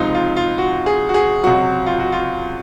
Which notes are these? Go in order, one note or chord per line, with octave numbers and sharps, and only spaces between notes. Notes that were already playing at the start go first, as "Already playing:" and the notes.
Already playing: C#2 C3 F3 G#3 D#4 F4
F4
F4
F#4
G#4
F#4
G#4
C#2 C3 F#3 F#4
F4
F#4
F4